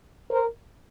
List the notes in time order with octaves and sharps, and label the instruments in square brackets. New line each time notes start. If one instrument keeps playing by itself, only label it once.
[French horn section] A#4 C5